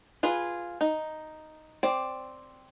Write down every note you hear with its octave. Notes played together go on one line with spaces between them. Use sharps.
F4 G#4 B4
D#4
C4 D5